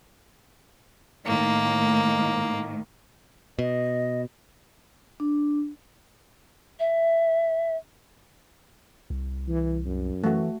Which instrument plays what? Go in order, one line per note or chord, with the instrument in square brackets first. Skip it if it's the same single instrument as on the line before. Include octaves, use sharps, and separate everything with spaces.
[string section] A2 D#3 [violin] A#3
[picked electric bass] B2 [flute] D#5
[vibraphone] D4
[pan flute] E5
[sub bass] C2
[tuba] E3
F#2
[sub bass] E3 [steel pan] A3 F#4